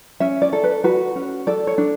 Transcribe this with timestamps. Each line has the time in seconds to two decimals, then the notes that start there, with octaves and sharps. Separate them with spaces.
0.20 C#4 E5
0.42 D5
0.53 A4
0.64 B4
0.84 F#4 B4
1.16 C#4
1.47 A4 D5
1.67 C#5
1.78 D4